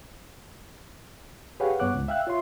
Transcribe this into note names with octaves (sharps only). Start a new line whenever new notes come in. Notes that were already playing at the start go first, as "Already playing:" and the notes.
G4 G#4 B4 C#5 F5 F#5
G2 B3 C#5 F#5 D6 F#6
C#2
E5 F5 G5 E6 F#6
F4 C#5 E5 C6